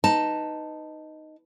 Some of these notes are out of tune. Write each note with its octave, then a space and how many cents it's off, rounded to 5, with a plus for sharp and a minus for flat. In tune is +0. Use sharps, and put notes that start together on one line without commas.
D#4 +0 B4 +0 A5 +5